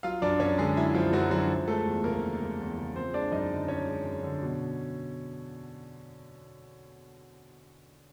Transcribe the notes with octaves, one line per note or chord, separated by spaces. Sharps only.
F#3 F4 F5
F#2 D4 D5
F#2 C#4 C#5
D3 G#3 G#4
F#3 E4
F#2 F3 F4
F#2 F#3 F#4
D3 F#3 F#4
F3
G#3 A3 A4
E2
C#3 A#3 A#4
F3
G#3
E2
C#3
F3 C4 C5
G#3 D4 D5
F#2 D#4 D#5
D3
F3 C#4 C#5
G#3
F#2
D3
B2